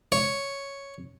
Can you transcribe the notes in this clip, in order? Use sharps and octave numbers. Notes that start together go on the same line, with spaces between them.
C#5